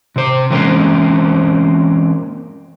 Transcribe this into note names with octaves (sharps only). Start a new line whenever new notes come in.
C3 C5
E3 G#3 A#3 C4 C#4 C5